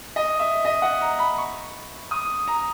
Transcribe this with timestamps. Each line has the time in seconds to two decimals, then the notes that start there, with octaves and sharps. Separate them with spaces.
0.16 D#5
0.40 E5
0.65 D#5
0.82 F#5
1.01 A#5
1.19 B5
1.38 C#6
2.11 D#6
2.48 A#5